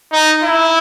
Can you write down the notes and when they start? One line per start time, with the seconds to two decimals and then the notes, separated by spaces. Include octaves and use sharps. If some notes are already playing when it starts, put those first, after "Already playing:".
0.13 D#4
0.43 E4